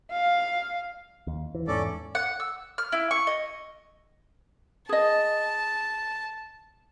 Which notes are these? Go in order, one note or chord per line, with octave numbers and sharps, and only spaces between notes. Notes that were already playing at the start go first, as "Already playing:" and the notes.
F5
D#2
E3
E2 G#2 C#4 A4 D5
F#5
E6
F6
E4
C#6
D#5
G#4 D#5 A5